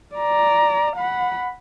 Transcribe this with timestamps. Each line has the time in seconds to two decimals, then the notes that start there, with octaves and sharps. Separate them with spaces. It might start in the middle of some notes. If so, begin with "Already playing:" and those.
0.16 D5 A#5
0.97 F#5 B5